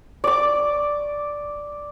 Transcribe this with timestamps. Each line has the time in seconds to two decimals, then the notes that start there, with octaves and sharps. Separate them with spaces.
0.24 D5 D6